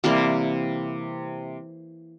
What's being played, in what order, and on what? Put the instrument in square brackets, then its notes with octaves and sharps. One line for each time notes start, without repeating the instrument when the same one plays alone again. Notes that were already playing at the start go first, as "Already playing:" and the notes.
[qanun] C3 E3 G3 A#3